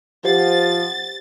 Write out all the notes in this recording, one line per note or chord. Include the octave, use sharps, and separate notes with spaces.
F3 G4 C5 F#5 A6